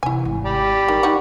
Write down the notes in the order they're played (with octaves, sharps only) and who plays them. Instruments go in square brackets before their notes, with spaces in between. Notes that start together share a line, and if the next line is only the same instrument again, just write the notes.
[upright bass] C3 E3 [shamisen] E4 G#5
[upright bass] G#1 A3
[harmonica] G4 D5 B5
[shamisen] D#3 [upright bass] G3
[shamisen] D#4 F#4